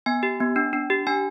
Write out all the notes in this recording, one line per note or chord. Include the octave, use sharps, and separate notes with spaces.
B3 G#5
G4
B3
D4
D4
G4
D4 G#5